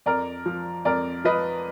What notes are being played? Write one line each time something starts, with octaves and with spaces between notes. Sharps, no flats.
F2 A#4 D5
F3
F2 A#4 D5
F3 B4 D#5